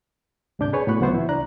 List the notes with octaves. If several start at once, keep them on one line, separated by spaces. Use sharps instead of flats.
D2 G#2 C3 D4 D6 G6
G#4 B4 C#5 D5 G#5
A2 B3 F#4 B5 C#6 F#6
C#2 F#3 B3 C5 E5 C#6
E3 E4
C2 D4 D5 A#5 F#6